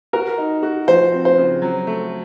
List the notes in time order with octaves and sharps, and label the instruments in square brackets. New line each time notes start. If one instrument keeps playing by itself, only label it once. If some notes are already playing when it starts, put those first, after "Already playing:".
[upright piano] F#4 [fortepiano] A#4
[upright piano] D#4
F#4
[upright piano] F3 [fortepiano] C5
[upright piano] C4
[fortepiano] C5
[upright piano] C#3
F#3
A3